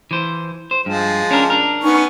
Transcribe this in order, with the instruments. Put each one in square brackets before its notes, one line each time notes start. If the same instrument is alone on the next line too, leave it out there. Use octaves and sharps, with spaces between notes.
[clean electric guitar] E3 C5
C5
[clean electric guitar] G2 [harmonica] F3 G#3
[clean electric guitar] C#4 D4 A#4
D4 A#4
[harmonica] B3 C#4 C#6 [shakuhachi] D#4